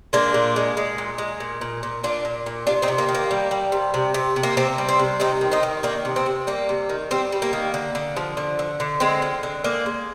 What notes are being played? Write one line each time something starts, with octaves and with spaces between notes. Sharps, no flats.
G#3 A#3 D4
A#2
G#3
G#3
A#2
G#3
A#2
A#2
A#2
A#2 D4 F4
A#2
A#2
C3 D4 F4
C4 D#4
C3
A#3
D#3
A#3
G3
G3
C3
C3
C3
C3
A#3
C3 C4
G3
C4
C3
C3 C4 D#4
D#3
C4 D#4
D#3
D#3 A#3 D4
C3
C4
C3
G3 A#3
C3
D#3
G3 C4
G3
A#3
D#3
D3
D3
F3
D3
D3
D3
G#3 C4
F3
D3
G#3 A#3 D4
G#3